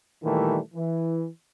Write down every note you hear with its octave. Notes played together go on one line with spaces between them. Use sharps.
A#2 D#3 E3 G3 A3
E3